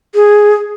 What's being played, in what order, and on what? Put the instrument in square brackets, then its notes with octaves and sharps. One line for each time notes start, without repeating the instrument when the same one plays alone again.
[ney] G#4